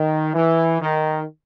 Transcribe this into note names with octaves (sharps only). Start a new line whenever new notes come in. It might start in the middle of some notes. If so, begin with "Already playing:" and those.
Already playing: D#3
E3
D#3